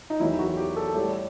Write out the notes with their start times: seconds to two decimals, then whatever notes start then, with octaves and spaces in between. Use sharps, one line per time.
0.10 D#4
0.20 E2 D#3 F#3 E4
0.39 F#4
0.57 G4
0.76 A4
0.94 A2 G3 G4